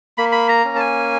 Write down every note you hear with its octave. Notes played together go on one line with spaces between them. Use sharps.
A#3 B5
B5
A#5
C#4
A5
G#5